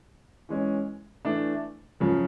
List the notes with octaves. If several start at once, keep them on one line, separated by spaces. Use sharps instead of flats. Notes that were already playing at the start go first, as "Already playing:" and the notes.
E3 G#3 C#4
E3 A3 D4
F#2 C#3 F3